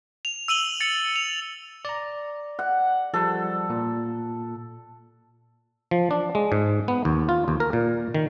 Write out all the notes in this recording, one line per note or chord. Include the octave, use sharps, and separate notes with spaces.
F7
E6 D#7 F#7 G7
A6 C#7
F7
D5 A#5
F#5
F3 G3 A4
A#2
F3
D4
G#3
G#2
B3
D#2
F4
D#2
A#4
A#2
D#3